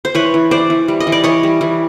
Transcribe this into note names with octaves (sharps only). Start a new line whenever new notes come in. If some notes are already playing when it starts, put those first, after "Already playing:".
C5
E3 B4 C#5
E3
E3 C5 D5
E3
G3
D#5
E3
D5
E3 C#5 D#5
G3
E3